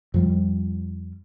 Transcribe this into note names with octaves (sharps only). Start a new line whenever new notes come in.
F2 F3 G3